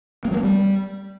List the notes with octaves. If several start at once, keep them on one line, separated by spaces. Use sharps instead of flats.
A#3
F#3
A#3
G3